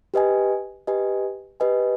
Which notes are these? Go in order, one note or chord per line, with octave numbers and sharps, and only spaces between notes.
G4 B4 D#5 G#5
G4 B4 D#5 G#5
G4 B4 D#5 G#5